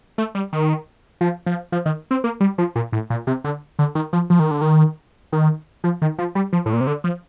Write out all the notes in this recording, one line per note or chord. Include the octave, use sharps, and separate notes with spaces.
A3
G3
D#3
F3
F3
F3
D#3
C4
A#3
G3
F3
A#2
A2
A#2
C3
D3
D3
D#3
F3
F3
D#3
D3
D#3
D#3
F3
D#3
F3
G3
F3
A2
A#2
C3
D3
F3